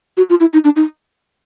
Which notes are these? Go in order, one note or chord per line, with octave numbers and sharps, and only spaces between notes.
F#4
F4
E4
D#4
D4
D#4